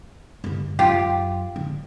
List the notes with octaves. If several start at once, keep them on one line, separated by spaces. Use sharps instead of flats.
G2 D3
F#2 F4 G4
D3